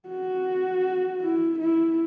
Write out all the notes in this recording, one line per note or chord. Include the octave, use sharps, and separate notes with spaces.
F#4
E4
E4